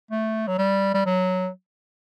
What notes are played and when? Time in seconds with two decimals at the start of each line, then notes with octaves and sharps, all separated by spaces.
0.11 A3
0.48 F#3
0.58 G3
0.94 G3
1.06 F#3